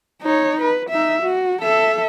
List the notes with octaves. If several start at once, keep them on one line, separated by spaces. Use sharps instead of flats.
D#4 C#5
B4
D#4 E5
F#4
A4 E5